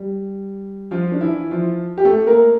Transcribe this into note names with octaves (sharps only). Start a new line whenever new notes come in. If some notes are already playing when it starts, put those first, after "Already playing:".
Already playing: G3
F3 F4
D4
E3 E4
F3 F4
G4
A3 A4
A#3 A#4